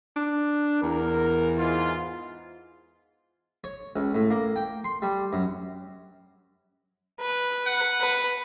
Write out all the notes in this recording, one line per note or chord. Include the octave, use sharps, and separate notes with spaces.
D4
E2 A#4
G#2 E3 F4
C#5
C#2
A2
A#3
G5
C6
G3
F#2
B4
F#5
B4